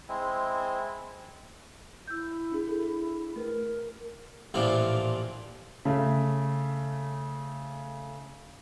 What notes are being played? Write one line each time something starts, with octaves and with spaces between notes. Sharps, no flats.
G#3 C4 E4
E4 E6 G6
D4 G#4
G#4 A4
A3 A#4 B4
A1 A#2 E3 F3 D4
C#3 A3